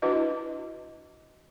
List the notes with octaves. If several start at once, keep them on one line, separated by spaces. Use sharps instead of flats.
D4 E4 F#4 B4 D#5